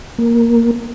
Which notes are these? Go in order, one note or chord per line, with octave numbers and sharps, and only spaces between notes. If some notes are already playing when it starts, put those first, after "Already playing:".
A#3